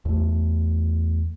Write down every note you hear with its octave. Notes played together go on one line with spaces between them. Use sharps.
E2 A3